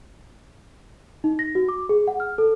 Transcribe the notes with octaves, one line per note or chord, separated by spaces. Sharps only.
D#4
A#6
F#4
D6
G#4
F#5
F6
A4